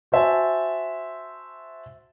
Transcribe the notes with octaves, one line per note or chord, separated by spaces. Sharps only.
F#4 C5 E5 G#5 A5